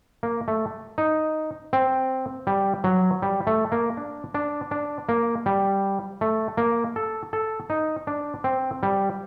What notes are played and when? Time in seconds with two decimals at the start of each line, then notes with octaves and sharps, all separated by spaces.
0.23 A#3
0.48 A3
0.98 D#4
1.73 C4
2.47 G3
2.84 F#3
3.22 G3
3.47 A3
3.72 A#3
3.97 D4
4.34 D4
4.71 D4
5.09 A#3
5.46 G3
6.21 A3
6.57 A#3
6.96 A4
7.33 A4
7.70 D#4
8.07 D4
8.44 C4
8.83 G3